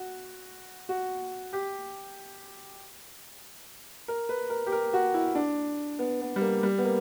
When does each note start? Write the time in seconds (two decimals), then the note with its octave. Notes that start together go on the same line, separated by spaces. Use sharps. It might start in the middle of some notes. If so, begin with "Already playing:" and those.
Already playing: F#4
0.89 F#4
1.53 G4
4.08 A#4
4.29 B4
4.50 A#4
4.66 G4
4.72 A#4
4.93 F#4
5.14 E4
5.35 D4
5.99 B3
6.21 B3
6.36 G3
6.41 A#3
6.63 G3
6.78 B3
6.85 A#3